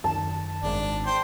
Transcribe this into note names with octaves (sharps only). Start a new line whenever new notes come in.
F#2 D#3 A5
G#1 D4
C5 G5